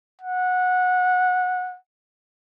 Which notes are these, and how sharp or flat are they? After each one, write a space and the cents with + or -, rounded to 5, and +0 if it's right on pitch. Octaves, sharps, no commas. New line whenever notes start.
F#5 -20